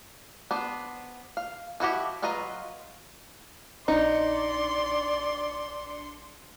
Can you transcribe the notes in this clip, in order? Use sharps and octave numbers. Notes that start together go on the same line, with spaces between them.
B3 D4 C5
F5
F3 E4 F#4 G4
F#3 F4 B4 D#5 A#5
A#1 D4 D#4 D5 C6 C#7